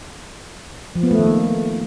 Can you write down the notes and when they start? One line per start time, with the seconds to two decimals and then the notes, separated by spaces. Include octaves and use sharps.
0.95 F3
1.03 B3
1.11 A3
1.19 D#3
1.27 A#3